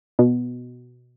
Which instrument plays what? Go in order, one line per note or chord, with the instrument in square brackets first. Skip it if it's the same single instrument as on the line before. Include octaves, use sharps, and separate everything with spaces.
[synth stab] B2